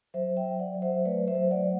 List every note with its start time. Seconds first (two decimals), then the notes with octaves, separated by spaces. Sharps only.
0.14 F#3 C5 E5
0.37 E5 G5
0.44 F#3
0.59 D5 F#5
0.75 F#3
0.82 C5 E5
1.05 A3 B4 D5
1.28 C5 E5
1.35 F#3
1.51 D5 F#5